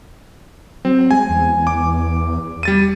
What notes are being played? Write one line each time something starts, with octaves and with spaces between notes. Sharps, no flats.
F#3 C4
G#3 G#5
E2
D6
G3 A6 D#7